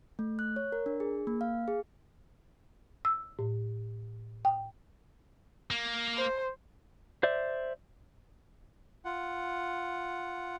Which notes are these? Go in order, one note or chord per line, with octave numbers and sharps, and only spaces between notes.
A3
F#6
C#5
A#4
D4
G#4
A#3
F5
G#4
E6
A2
G5
A#3
C5
C5 D5 E5
F4 F#5